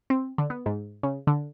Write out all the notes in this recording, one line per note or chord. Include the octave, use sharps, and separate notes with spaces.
C4
D3
B3
G#2
C#3
D3